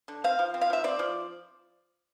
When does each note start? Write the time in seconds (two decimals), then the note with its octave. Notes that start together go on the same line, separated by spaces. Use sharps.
0.08 D3
0.24 C4 F5
0.39 F3
0.54 C4
0.61 F5
0.70 F3 E5
0.84 C4 D5
0.99 F3